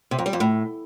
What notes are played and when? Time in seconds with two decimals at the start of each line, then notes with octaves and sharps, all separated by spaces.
0.11 C3
0.19 F2
0.26 G3
0.33 F2
0.40 A2